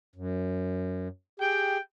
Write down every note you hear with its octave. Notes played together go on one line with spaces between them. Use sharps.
F#2
G4 G#4 G5